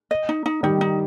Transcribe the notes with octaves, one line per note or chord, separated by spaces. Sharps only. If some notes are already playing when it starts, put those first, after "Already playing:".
D#5
D#4
D#4
D#3 G3 D#4
D#4